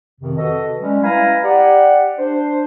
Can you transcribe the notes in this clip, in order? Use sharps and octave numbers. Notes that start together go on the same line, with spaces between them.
F2 C3 D#3
F#4 A4 B4 D#5
G3 G#3 C#4
E4 B4 F5 G#5 A#5 B5
G4 D5 F#5
D4 C5